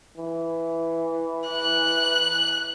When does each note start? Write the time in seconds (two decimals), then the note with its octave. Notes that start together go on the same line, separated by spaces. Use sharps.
0.17 E3
1.48 F#6